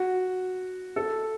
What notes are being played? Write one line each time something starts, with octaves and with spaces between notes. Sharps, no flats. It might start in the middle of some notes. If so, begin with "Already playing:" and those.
Already playing: F#4
A4